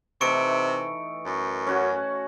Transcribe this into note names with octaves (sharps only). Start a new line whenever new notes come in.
C3 E3 A3 D#4 C#6 C#7 D7
F#2
C#4 F#4 F#5 G#5